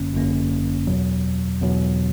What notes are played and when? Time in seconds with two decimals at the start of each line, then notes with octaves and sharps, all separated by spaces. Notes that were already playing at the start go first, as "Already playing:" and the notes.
Already playing: G1 F#2 D3 A#3 C#4
0.14 G1 F#2 D3 A#3 C#4
0.87 E2 B2 F#3
1.61 E2 B2 F#3